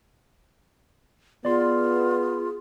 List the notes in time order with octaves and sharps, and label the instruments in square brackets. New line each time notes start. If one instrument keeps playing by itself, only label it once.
[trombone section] B3 [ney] F4 [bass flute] G#4 [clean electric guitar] D5 C6